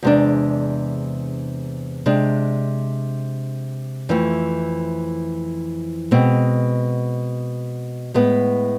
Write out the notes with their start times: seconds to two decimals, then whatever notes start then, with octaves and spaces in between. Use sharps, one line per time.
0.03 E2 C3 G#3 D4
2.06 C3 G#3 D4
4.09 F2 E3 A3
6.11 B2 G#3 C4
8.14 A2 G#3 B3